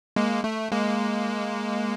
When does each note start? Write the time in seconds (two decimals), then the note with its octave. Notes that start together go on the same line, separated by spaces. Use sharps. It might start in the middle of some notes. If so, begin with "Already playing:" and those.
0.16 G#3 A#3
0.44 A3
0.72 G#3 A#3